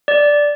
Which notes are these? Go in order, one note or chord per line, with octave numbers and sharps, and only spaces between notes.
D5